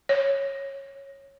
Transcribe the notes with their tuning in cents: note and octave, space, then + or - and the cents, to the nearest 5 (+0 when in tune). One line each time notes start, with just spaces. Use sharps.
C#5 -15